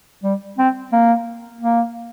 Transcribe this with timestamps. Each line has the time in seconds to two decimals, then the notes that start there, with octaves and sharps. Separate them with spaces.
0.24 G3
0.58 C4
0.92 A#3
1.61 A#3